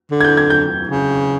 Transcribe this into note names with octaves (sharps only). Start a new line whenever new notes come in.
D3
G#6
G6
G#6
G6
C#3